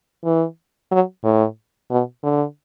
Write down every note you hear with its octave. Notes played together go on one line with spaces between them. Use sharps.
E3
F#3
A2
B2
D3